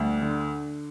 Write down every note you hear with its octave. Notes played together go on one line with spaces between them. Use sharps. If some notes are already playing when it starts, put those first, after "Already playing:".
Already playing: D2 G3
D3